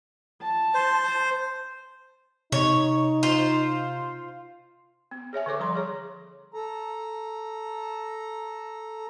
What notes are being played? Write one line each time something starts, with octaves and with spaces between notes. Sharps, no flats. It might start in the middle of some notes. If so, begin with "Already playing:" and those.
A5
C5
C3 D#4 C#5
F4 C5
B3
G#4 C#5 E5 G#5
D3 A4 C#5 D6
F3 G3 A#5 C6
G#4 C#5
A4 A#5